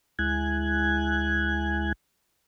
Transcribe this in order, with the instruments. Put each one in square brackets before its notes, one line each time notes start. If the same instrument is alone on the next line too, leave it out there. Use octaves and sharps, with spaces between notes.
[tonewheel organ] D2 G#3 E4 G#5 F#6 G#6